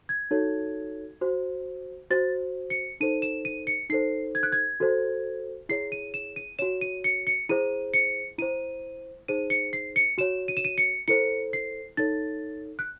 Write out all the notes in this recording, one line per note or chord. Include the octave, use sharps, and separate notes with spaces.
G#6
D#4 F#4 A4 C#5
F#4 C5
F#4 C5 A6
C#7
D#4 A4 C5 D#7
E7
D#7
C#7
D#4 A4 C5 C7
G#6
F#6
G#6
F#4 A4 C5
E4 G#4 C#5 C7
D#7
E7
D#7
F#4 C#5 E7
D#7
C#7
C#7
E4 G#4 C5 D#7
C#7
E4 C5 D#7
D#4 G#4 C5 D#7
C#7
C7
C#7
F#4 C#5 E7
D#7
E7
D#7
C#7
E4 A4 C5 C#7
C7
D#4 A4 C#5 A6
F#6